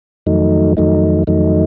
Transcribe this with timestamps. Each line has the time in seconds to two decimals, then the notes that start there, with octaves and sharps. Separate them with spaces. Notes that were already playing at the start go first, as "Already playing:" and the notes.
0.26 F2 D#3 F#3 A3 D#4
0.77 F2 D#3 F#3 A3 D#4
1.27 F2 D#3 F#3 A3 D#4